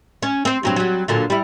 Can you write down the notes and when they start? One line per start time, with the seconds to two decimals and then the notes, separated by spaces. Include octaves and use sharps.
0.22 C#4
0.45 C4 C5
0.63 G2 F#3 C4
0.76 F#3 G3
1.08 A#2 D3 F#3
1.30 G3 E4